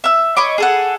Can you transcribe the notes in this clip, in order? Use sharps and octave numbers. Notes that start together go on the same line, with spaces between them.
E5 E6
C#5 D#5 B5 D6
G#4 A4 F#5